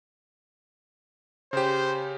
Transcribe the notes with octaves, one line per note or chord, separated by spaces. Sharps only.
C#3 G4 C5